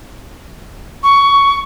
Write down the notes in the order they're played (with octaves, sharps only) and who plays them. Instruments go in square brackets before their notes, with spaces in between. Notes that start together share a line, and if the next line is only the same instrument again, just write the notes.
[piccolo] C#6